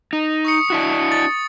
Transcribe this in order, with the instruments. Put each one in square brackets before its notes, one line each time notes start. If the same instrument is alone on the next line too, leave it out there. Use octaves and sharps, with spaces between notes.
[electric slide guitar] D#4
[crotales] C#6 D#6 C#7
[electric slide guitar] D4 E4 F#4
[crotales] A6